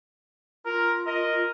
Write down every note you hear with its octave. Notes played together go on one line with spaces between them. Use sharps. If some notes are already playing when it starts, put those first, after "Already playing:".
F4 A#4
A#4 D#5